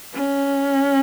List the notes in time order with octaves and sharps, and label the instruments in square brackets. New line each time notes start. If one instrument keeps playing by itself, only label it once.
[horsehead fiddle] C#4